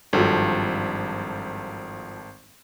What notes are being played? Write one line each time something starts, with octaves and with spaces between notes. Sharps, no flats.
G#1 G2 F3 F#3 A4